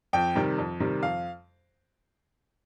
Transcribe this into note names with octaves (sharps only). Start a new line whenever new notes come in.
F2 G5
C3 D#3 G3
F2
C3 D#3 G3
F2 F5